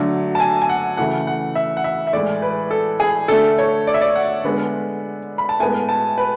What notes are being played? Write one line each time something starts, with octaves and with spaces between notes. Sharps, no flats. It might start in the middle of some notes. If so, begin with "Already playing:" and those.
Already playing: D3 F#3 A3
A5
G#5
G#5
F#5
C#3 E3 A3 F#5
F#5
E5
F#5
E5
E5
A2 E3 G#3 D5
B4
A4
G#4
D3 A3 A4
C#5
D5
E5
D5
F#5
D3 G#3 B3
B5
A5
A2 G#3 B3 G#5
A5
B4